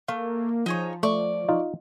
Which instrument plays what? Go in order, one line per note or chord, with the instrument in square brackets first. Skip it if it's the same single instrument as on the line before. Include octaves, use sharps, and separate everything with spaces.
[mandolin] A3 [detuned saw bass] A#3 [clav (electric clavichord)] F5
[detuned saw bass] F3 [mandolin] D#4 G#4 C#5
[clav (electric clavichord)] A3 [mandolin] D5 C#6
[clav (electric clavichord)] D#4 F4